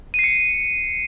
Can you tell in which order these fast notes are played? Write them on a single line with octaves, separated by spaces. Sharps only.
D#7 C7 C#7